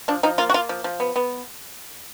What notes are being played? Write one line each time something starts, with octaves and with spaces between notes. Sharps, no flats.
F3 D4
F3 D#4
A#3 F4
F#4
A#3 F4
F3
F3
B3
B3